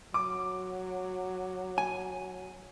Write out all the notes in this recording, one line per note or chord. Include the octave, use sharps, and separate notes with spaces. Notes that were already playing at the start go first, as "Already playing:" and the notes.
F#3 D6
G#5